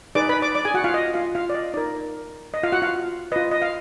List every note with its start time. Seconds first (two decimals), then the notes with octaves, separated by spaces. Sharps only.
0.15 D#4 G#4 B4 D5 D6
0.29 B4 B5
0.42 D5 D6
0.55 D5 D6
0.65 G#4 G#5
0.74 F#4 F#5
0.84 F4 F5
0.94 D#5
1.14 F4 F5
1.35 F4 F5
1.50 D5
1.55 D#5
1.74 D#4 A#4 D5
2.54 D#5
2.63 F4 F5
2.72 F#4 F#5
2.82 F4 F5
3.32 F4 B4 D#5
3.51 D#5
3.62 F5